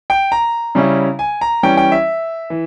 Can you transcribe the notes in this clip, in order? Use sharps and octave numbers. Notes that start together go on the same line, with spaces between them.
G5
A#5
C#3 G3 C#4 E4
G#5
A#5
E3 G3 C#4 G5
G5
E5
E3